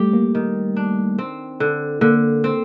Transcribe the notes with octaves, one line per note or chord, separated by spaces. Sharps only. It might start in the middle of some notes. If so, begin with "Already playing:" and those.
Already playing: G3 A3 G4
A#3
D#3
D4
C4
D3
D3 A#3
C4